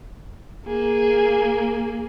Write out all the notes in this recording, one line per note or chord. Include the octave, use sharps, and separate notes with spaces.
A#3 G#4